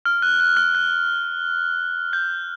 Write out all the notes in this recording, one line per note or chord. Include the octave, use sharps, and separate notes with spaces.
F6
F#6
F#6
F6
F#6
G6